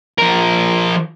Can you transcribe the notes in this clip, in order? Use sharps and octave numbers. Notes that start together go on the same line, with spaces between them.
F3 A#4